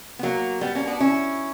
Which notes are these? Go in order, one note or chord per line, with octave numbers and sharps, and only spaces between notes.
B3
F#3 A#3
G3 B3
A#3 C#4
B3 D4
C#4 E4